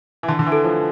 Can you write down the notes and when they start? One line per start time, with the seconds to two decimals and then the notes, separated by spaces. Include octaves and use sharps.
0.23 E3
0.28 D3 A5
0.39 D3
0.46 E3
0.52 A4
0.64 F3